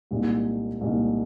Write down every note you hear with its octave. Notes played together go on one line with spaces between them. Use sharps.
C2 A#2 G#3 D#4
C2 A#2 G#3 D#4